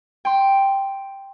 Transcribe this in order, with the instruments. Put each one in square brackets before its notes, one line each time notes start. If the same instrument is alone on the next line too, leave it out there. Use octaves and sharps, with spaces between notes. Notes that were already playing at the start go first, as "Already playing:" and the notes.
[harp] G5 C6